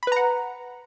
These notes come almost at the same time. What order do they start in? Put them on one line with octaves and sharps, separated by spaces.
B5 B4 A#5 F#5